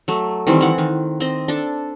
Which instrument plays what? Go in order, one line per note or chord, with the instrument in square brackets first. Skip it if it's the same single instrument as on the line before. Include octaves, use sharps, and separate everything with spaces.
[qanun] F#3 A3
D#3 E3 G3 C4
E3 F#5
D#3
C4 D#5
D4 A4